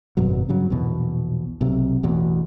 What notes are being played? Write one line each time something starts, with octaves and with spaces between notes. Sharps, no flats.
G#1 F#2 B2 F#3
G2 C#3 F#3
A#1 E2 B2
B1 C3
A1 E2 B2